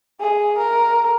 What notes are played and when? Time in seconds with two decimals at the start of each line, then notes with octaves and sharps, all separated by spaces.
0.20 G#4
0.58 A#4